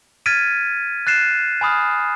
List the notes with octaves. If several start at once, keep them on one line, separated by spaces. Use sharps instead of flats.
F6 G#6 A6 B6 D7 D#7
F#6 A6 C7 E7
G#5 B5 D#6 F6